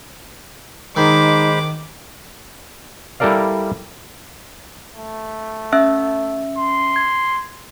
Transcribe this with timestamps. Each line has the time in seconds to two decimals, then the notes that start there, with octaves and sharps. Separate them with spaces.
0.96 D#3 G#3 D#4 C5 B5 D6
3.20 G3 E4 A4 A#4 D5 F5
4.95 A3
5.73 C#4 E5 E6
6.57 C6
6.96 G#6